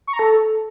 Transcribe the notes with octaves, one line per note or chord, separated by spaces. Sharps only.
C#6
A#5
A4